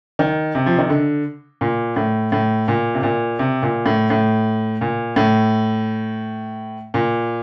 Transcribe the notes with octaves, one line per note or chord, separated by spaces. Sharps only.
D#3
C3
F3
D#3
D3
A#2
A2
A2
A#2
C3
A#2
C3
A#2
A2
A2
A#2
A2
A#2